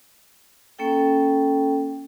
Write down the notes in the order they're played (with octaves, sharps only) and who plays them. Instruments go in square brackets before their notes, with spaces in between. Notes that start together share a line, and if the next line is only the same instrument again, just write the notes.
[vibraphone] A#3 C#4 A4 G5